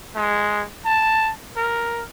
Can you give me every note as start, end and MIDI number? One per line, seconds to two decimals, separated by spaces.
0.15 0.63 56
0.85 1.31 81
1.57 2.02 70